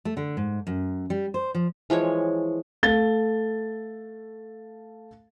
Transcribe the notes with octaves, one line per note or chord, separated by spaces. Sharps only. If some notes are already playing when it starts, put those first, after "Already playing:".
A3
D3
G#2
F#2
G3
C5
F3
E3 F3 G#3 C#5
A3 A4 F5 A6 G7